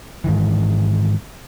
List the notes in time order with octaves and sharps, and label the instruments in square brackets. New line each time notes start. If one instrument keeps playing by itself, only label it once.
[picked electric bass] G#2 D#3 E3